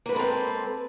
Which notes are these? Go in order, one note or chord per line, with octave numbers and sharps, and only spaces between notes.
G#3 A#3 C4 A4 B4